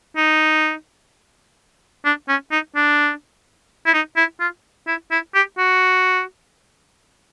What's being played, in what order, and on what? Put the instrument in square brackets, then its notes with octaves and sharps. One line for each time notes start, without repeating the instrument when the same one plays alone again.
[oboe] D#4
D4
C#4
D#4
D4
E4
D#4
E4
F4
E4
E4
G4
F#4